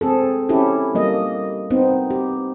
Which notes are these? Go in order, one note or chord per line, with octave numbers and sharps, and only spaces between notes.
C4 G#4 A4
C#4 E4 G4 A4
G3 A#3 D#5
B3 C4 D#4
G4